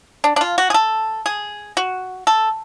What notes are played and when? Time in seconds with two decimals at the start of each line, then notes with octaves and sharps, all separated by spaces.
0.24 D4
0.36 D4
0.41 F4
0.58 F#4
0.70 G#4
0.74 A4
1.26 G#4
1.77 F#4
2.27 A4